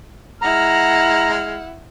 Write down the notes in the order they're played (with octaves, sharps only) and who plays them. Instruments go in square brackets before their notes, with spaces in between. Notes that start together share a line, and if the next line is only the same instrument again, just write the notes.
[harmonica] G#3 F6 [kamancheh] E4 F#5 [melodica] A#5